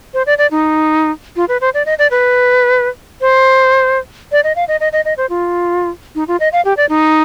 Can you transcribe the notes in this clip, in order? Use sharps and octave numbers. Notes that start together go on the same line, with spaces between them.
C5
D5
D5
D#4
F4
B4
C5
D5
D#5
D5
B4
C5
D5
D#5
F5
D#5
D#5
D#5
D#5
C5
F4
D#4
F4
D#5
F5
G4
D5
D#4